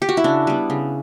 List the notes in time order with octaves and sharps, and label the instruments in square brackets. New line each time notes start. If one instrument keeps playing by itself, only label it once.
[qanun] G4
F#4
E4
C#3 D4
G3 B3
C#3